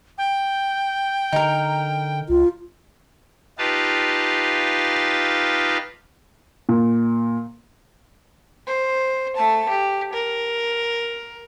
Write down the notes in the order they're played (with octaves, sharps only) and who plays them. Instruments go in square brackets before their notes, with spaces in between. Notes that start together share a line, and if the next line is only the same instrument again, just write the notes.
[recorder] G5
[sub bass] D3 [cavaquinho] D#4 A#4
[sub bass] C#2 [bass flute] F4
[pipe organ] D#4 F4 G4 B4 F5 A5
[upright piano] A#2
[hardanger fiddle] C5
A3 A5
G4
A#4